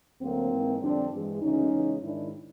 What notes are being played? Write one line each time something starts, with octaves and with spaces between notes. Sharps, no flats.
D2 D3 F#3 A#3 C4
G#2 E3 G#3
F2 D3 G3 C4 D4
G2 E3 G#3
D2 C#3 E3 G#3 C#4 D#4
E2 C#3 E3 G#3
G#2 D#3 G#3 D4 E4